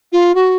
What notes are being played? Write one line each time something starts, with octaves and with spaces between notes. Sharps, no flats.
F4
F#4